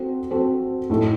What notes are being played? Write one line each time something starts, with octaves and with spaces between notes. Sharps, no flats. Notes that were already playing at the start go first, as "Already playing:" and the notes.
Already playing: C4 F#4 A4 C5
C4 F#4 A4 C5
A2 A3 D#4 A4